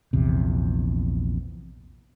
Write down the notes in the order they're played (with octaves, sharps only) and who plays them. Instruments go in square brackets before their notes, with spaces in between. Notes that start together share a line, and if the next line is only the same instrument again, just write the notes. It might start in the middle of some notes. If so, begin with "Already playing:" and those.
[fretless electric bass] A#1 E2 C3